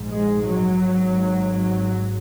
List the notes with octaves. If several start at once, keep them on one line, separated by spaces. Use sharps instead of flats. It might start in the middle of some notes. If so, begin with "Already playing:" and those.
Already playing: A#1 G#2
G#3
F#3
G#1 G#2
F#3